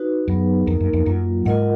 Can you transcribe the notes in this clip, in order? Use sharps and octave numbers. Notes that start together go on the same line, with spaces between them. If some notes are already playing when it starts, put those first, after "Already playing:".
Already playing: D#4 F#4 B4
F#2 F#3 B3 D#4 G#4 B4
F2 A#3 D#4 A#4
F#2
F2
F#2 F#3 A#3 F4
G#2 F4 A#4 D#5 F#5